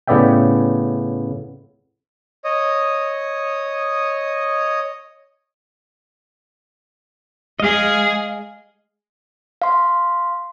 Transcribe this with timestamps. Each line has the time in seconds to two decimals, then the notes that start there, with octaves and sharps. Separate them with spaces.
0.07 A2 C#3 B3 D5 E5 G5
2.45 C#5 D#5 D#6
7.60 G#3 G#4 D#5 F5
9.62 F5 C6